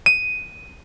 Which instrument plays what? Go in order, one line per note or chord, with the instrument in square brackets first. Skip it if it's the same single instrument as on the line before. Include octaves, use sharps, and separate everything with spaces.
[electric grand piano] D#7